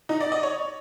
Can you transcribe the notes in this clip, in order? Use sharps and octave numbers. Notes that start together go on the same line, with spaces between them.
D#4
D5
D#5
C#5